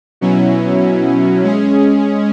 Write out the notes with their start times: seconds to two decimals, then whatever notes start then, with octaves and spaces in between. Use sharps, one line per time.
0.21 B2 F#3 C#4 E4
1.44 G#3 C#4 G#4